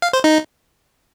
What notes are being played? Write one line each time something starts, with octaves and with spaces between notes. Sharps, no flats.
F5
C5
D#4